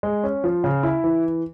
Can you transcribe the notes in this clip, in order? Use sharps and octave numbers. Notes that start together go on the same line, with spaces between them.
G#3
C#4
F3
C#3
E4
E3